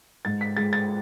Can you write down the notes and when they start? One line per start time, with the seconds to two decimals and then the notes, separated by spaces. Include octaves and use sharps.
0.25 G#2 A6
0.41 B6
0.57 G#3 A6
0.73 A6